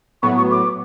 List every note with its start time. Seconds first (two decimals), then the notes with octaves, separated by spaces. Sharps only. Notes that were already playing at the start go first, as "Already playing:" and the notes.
0.23 A2 F#3 B3 C#6
0.37 C#6
0.51 D6